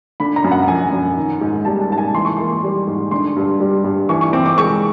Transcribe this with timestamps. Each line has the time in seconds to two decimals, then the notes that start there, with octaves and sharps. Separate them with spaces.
0.20 D3 B5
0.36 A#5
0.44 F#2
0.51 F#5
0.68 F3 G#5
0.92 F#2
1.16 D#3
1.41 G#2
1.65 G3 A5
1.90 G#2 A5
1.98 G#5
2.14 E3 C6
2.25 C#6
2.37 A#3 C6
2.63 G3
2.87 G#2
3.11 D3 C6
3.36 G2
3.60 G3
3.84 G2
4.09 E3 C#6
4.21 C#6
4.33 C4 D6
4.46 D6
4.57 G#3 C#6